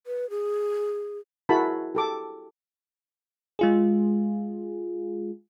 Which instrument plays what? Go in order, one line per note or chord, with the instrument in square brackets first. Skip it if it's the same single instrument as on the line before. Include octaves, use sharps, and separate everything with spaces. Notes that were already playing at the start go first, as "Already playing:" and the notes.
[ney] B4
G#4
[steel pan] E4 F#4 G#4 A#4 A5 B5
G4 A4 D6
[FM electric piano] G#3 F4 G#4